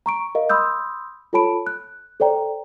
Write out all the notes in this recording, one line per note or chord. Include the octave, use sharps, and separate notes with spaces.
A#5 C#6 D7
A#4 D#5 F5
B5 C6 D#6 E6 G6
F4 A4 C#5 A5 B5 D7
F#6
A4 C5 D5 G5 A#5